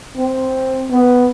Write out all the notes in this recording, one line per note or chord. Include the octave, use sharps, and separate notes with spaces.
C4
B3